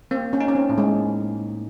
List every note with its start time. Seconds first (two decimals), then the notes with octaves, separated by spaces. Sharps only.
0.11 A#3 C4
0.33 C#4
0.40 D#4
0.48 C#4
0.55 C4
0.70 A2
0.78 G#3